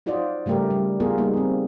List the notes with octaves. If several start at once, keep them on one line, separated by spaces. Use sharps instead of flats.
D#4 F4 F#4 C5 D5 D#5
C#3 G3 A3 G4 A#4
G3
B3 F4 G#4 A#4
G3 A#3 D#4
G3 C4